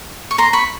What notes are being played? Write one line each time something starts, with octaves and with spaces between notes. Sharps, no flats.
C#6
A#5 C6
B5 C#6